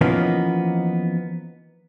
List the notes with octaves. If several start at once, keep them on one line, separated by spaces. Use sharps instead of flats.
E3 F3 A#3 B3 C#4 D#4